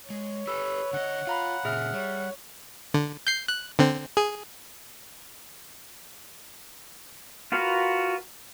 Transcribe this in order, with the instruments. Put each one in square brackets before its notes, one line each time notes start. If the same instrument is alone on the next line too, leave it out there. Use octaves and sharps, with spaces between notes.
[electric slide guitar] G#3 [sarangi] C#5
[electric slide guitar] G4 A4 [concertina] B4 [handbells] E6
[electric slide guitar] D3 D#5 [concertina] F#5
[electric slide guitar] F4 [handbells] F5 A#5 B5
[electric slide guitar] A#2 C#3 [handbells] G#4 E5 F6
[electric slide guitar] G3 [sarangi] C#5
[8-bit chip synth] D3
G6 C7
F#6
D3 C4
G#4
[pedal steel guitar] F4 F#4 A#4 B4